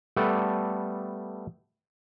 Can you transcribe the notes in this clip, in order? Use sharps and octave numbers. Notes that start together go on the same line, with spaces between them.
G3 A3 B3 A4 D5